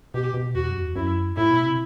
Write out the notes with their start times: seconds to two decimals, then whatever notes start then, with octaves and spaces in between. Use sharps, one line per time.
0.14 B2 G4
0.34 B2
0.55 E2 F#4
0.69 F#2
0.82 E2
0.96 F#2 E4
1.37 A2 E4
1.50 B2
1.64 C3